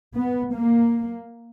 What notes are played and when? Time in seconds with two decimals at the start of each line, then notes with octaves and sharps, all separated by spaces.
0.16 B3
0.54 A#3